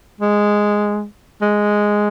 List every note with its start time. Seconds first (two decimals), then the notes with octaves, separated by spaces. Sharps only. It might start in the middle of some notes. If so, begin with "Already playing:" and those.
0.20 G#3
1.42 G#3